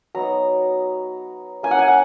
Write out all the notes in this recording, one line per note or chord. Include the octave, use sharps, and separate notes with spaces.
F#3 B3 D#4 A#5
A#3 C#4 E4 G#5
F#5
G#5
F#5